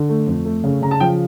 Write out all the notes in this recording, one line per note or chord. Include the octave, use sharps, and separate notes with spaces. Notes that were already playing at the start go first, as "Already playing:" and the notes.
Already playing: D3
A3
F2
A3
C#3
C#3 A#5
A5
F3 G5